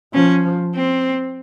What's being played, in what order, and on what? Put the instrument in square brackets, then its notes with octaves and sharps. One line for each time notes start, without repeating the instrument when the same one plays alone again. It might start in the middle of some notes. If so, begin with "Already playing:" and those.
[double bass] F3 [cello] C#4
[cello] C4